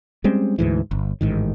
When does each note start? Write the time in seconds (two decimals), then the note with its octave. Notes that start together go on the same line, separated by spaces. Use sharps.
0.24 G3 G#3 C4 C#4
0.59 D2 G#2 E3
0.91 G1
1.21 A1 G#2 D#3